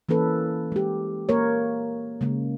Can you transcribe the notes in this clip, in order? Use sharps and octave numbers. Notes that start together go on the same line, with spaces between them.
E3 A#3 C#4 A4 B4
G#3 G4
A#3 A#4 C#5
C#3 G#3 A#3